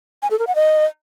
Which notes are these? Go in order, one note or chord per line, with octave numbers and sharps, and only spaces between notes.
G#5
A4
A#4
F#5
D#5